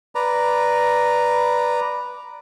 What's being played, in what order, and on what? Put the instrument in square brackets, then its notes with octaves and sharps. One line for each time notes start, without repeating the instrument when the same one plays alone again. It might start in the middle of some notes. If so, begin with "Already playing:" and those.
[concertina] B4 D5 A#5